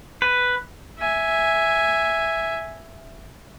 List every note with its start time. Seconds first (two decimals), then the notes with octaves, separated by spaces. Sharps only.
0.22 B4
0.99 E5 G#5